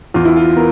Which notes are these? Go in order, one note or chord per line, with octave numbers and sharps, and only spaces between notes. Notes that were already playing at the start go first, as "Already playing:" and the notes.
E2 F4
E4
F4
B3 A#4